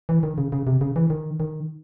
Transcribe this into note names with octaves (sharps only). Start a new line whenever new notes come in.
E3
D#3
C#3
C#3
C3
C#3
E3
D#3
D#3